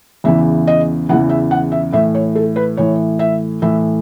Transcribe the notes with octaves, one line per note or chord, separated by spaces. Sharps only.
E2 C#3 E3 E5
D#5
E2 C#3 E3 F#5
E5
F#5
E5
A2 E3 E5
C#5
A4
B4
A2 E3 C#5
E5
A2 E3 E5